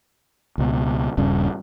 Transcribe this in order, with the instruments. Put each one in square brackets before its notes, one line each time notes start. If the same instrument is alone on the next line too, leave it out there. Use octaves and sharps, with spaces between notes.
[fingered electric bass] C#2 B2
D#1 G2 C#3